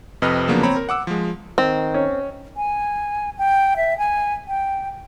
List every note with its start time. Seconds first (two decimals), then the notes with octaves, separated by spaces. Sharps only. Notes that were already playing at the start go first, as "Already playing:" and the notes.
0.22 F2 C3 B4 D#5 F6
0.48 C#3 F3 F#3 A#3 B3 D4
0.63 C4 C#5 A#5 B5
0.77 A#4
0.89 F#5 D6 E6
1.07 F3 G#3
1.58 D#3 C4
1.94 C#4
2.56 G#5
3.38 G5
3.77 E5
3.98 G#5
4.48 G5